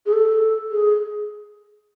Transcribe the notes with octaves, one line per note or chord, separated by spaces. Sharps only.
G#4
A4
G#4